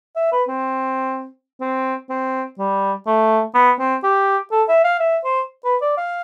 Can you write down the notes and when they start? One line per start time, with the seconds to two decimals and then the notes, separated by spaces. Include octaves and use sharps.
0.16 E5
0.32 B4
0.48 C4
1.61 C4
2.10 C4
2.58 G3
3.07 A3
3.54 B3
3.79 C4
4.03 G4
4.52 A4
4.69 E5
4.84 F5
5.00 E5
5.24 C5
5.65 B4
5.82 D5
5.97 F5